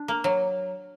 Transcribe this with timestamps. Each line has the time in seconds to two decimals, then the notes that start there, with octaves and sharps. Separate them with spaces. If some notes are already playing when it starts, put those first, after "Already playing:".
Already playing: D4
0.08 A#3
0.24 F#3